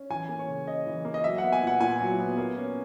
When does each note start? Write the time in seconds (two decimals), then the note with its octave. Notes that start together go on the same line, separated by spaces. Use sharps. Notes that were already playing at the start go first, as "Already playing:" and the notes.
Already playing: C#4
0.10 E3 G#5
0.29 A#3
0.39 C#5
0.48 C#3
0.67 C#4 D#5
0.86 E3
1.05 A#3
1.14 D#5
1.24 F#3 E5
1.38 B3 F#5
1.53 G#5
1.62 A#2 F#5
1.80 A#2 G#5
2.00 F#3
2.19 B3
2.38 A#3
2.57 C#4